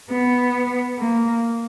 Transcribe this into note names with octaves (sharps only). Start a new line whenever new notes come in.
B3
A#3